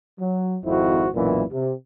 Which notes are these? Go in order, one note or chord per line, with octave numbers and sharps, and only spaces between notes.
F#3
G#1 F2 E4 F#4 C5
B1 F#2 A#2 E3 E4
C3